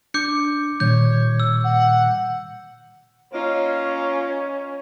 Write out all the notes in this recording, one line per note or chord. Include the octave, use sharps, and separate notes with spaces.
D4 D6 G6 C#7
A#2 D#3 G3 C#5 G6
E6
F#5
A#3 C#4 D#4 F4